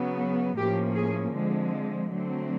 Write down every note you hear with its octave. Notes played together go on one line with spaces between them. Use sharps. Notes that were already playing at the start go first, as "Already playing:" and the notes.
Already playing: C#3 F#3 B3
A2 F3 A#3 C#4 G4
G#4
D3 F3 G#3 C4
D3 F#3 A3 C4